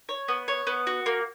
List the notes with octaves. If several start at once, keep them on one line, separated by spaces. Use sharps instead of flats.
C#5
B3
C#5
B3
F#4
A#3